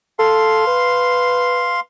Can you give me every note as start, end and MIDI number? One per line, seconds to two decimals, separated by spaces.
0.19 0.64 69
0.19 1.80 77
0.19 1.80 84
0.67 1.81 71